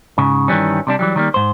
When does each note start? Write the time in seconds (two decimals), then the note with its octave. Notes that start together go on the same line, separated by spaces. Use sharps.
0.18 G#2 C#3
0.48 G2 D#3 E3 G3 C#4
0.87 C3 G3 D4
0.99 E3 F#3 G3
1.16 D#3 G3 A#3
1.34 G#2 C5